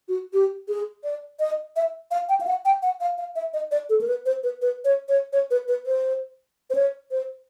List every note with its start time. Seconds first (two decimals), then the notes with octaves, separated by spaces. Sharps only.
0.08 F#4
0.33 G4
0.68 G#4
1.04 D5
1.40 D#5
1.76 E5
2.11 F5
2.29 G5
2.41 F5
2.47 F#5
2.65 G5
2.83 F#5
3.01 F5
3.18 F5
3.36 E5
3.53 D#5
3.71 D5
3.89 A4
4.01 A#4
4.07 B4
4.26 C5
4.43 B4
4.62 B4
4.85 C#5
5.09 C#5
5.33 C#5
5.51 B4
5.68 B4
5.86 C5
6.70 C5
6.75 C#5
7.11 C5